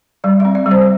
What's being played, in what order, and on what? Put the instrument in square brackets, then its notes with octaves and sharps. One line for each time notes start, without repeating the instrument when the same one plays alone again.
[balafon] G3 D5
C4 E5
D5
G3
C5